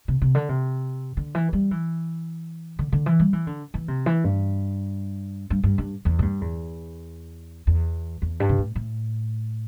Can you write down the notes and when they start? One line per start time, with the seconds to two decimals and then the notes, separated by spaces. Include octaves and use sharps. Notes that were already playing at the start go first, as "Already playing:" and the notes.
0.08 C3
0.22 C3
0.35 D3
0.49 C3
1.17 D3
1.35 E3
1.53 G3
1.71 E3
2.79 D3
2.92 D3
3.06 E3
3.20 G3
3.33 E3
3.47 D3
3.74 E3
3.88 C3
4.06 E3
4.24 G2
5.50 G2
5.64 G2
5.78 G2
6.05 E2
6.19 A2
6.22 G2
6.41 E2
7.67 E2
8.22 E2
8.40 G2
8.49 C3
8.58 A2
8.76 A2